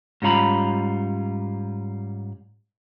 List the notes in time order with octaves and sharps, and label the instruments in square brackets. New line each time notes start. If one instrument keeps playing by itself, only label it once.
[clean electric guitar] G#2 G3 C#4 F4 A#5 B5